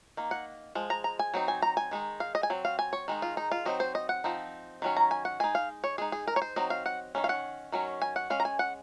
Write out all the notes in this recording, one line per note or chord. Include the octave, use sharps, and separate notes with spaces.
D#3 A#3
F#5
F3 G#3
A#5
A#5
G#5
F#3 C4 D#4
G#5
A#5
G#5
D#3 G#3 D#4
F5
D#5
G#5
F#3 C4
F5
G#5
C#5
D#3 G#3 D#4
F4
D#4
F4
F#3 C4 D#4 D#5
C5
D#5
F#5
F3 C4 D#4
D#3 F#3 C#4
A#5
G#5
F#5
G#3 D#4 G#5
F5
C#5
G#3 D#4 G#4
G#4
A#4
C#5
C5
F#3 C4 D#4 D#5
F5
F#5
D#3 F#3 C#4
F5
F#5
D#3 F#3 C#4
G#5
F#5
G#3 C#4 F5
A#5
G#5
F#5